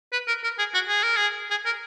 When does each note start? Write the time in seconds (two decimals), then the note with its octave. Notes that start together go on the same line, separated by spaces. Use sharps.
0.12 B4
0.28 A#4
0.44 A#4
0.59 G#4
0.74 F#4
0.88 G#4
1.03 A#4
1.17 G#4
1.51 G#4
1.66 A#4